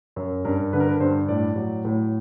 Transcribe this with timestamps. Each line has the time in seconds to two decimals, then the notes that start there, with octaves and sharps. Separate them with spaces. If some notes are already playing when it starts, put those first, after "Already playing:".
0.16 F#2
0.45 G2 A#4
0.73 D3 B4
0.80 A#4
0.88 B4
1.00 G2 C5
1.28 A2 D5
1.56 F#3
1.85 A2